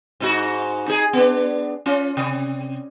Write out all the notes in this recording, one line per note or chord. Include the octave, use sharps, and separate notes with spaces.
G#2 D#4 F#4
D#4 G#4
B3 D4
C#4 F4
C3